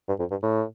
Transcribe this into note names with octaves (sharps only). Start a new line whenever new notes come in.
G2
F2
G2
A2